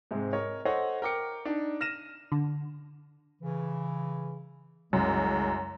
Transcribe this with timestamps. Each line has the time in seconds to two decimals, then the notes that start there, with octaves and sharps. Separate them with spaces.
0.11 G#2 C3 G#3
0.33 A#4 C#5 D#5
0.65 A4 C5 C#5 D#5 F#5
1.02 A#4 G5 D6 C#7
1.45 D4 D#4
1.81 F6 A#6 D#7 E7
2.32 D3
3.42 C#3 E3
4.93 C2 F#2 C#3 G#3